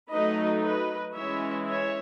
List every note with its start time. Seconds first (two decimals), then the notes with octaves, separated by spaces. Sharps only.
0.11 F#3 A3 D#4 B4 D#5
0.63 B4 D#5
1.16 E3 G#3 C#4 E4 C#5 E5
1.69 C#5 E5